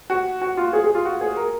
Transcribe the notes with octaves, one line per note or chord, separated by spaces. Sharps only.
F#4
F#4
F4
G#4
G#4
F4
F#4
G#4
A#4